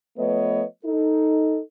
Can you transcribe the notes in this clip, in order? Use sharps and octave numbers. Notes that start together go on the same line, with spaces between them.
F3 A3 B3 B4 C#5 D#5
D#4 A4